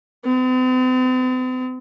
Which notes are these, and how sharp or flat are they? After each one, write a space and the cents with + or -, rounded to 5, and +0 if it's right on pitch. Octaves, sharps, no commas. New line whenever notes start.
C4 -45